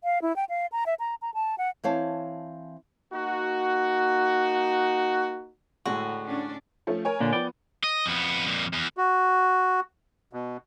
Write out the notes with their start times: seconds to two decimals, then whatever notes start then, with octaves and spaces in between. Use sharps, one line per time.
0.04 F5
0.22 E4
0.36 G5
0.49 F5
0.72 A#5
0.86 E5
1.00 A#5
1.22 A#5
1.34 A5
1.58 F#5
1.84 E3 C4 C#5 F5 A5
3.13 A#3 D#4 F#4
5.86 A2 D3 G#3 F#4
6.25 C#4 D4
6.87 F3 A3 C#4
7.05 A#4 C#5 G#5
7.20 A#2 D3 D4
7.33 F3 B3 D5 G5
7.84 D#5
8.06 F2 B3
8.47 F2 A#2
8.73 E2
8.97 F#4
10.33 B2